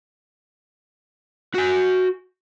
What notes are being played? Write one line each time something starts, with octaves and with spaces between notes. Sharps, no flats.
F#4 G#5